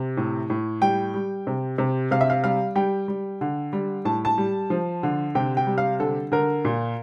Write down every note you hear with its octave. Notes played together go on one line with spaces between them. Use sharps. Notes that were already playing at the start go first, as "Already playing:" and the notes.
Already playing: C3
A2
A2
G3 G5
G3
C3
C3
C3 F5
E5
F5
G3 F5
G3 G5
G3
D3
G3
A2 A5
A5
G3
F3
D3
C3 G5
G5
G3
F5
D3 A4
D3 A#4
A#2